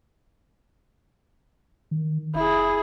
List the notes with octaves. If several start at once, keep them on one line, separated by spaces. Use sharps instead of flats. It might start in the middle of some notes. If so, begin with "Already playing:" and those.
D#3
F1 E4 G#4